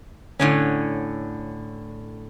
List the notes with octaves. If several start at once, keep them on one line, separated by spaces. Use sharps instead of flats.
A2 D3 C#4